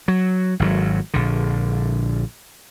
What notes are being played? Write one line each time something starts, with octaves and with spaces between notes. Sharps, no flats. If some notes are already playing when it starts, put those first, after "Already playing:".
F#3
G#1 D#3 F#3
A#1 D3